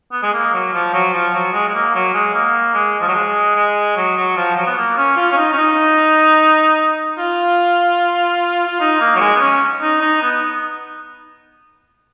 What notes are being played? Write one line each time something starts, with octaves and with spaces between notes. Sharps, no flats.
B3
G#3
A#3
F#3
F3
F#3
F3
F#3
G#3
G#3
A#3
F#3
G#3
A#3
G#3
F3
F#3
G#3
G#3
F#3
F#3
F3
F#3
B3
A#3
C#4
F4
C#4
D#4
C#4
D#4
F4
F4
D#4
A#3
F#3
G#3
B3
C#4
D#4
D#4
B3